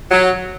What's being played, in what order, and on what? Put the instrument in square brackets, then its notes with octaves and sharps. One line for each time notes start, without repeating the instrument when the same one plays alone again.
[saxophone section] F#3